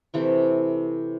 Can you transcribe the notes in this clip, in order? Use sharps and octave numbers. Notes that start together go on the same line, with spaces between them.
C3 E3 A3 E4